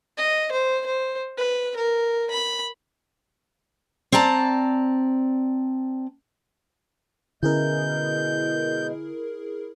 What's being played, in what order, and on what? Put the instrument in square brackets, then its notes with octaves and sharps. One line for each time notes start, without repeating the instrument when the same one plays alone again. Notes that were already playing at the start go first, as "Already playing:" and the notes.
[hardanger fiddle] D#5
C5
C5
B4
A#4
B5
[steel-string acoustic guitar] C4 D5 A5 A#5
[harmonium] B2 G#3 [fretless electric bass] D3 C#4 [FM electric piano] E4 G#4 A#4 [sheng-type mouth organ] G6